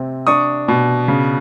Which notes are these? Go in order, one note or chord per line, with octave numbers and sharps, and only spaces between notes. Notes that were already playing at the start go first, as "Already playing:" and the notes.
Already playing: C3 C4
D4 C#6 D#6
B2
C#3